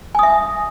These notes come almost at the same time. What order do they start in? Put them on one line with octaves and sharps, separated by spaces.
G#5 D#6 E5